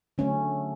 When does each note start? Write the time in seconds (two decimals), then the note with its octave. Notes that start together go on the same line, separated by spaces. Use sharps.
0.18 D3 F#3 A3 C#4